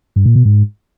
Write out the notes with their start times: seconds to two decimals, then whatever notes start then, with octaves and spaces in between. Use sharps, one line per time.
0.16 G2
0.26 A#2
0.35 B2
0.45 G#2